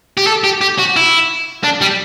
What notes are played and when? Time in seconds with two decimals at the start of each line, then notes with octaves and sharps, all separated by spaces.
0.17 G4
0.27 A4
0.44 G4
0.61 G4
0.79 F#4
0.96 E4
1.64 D4
1.81 G3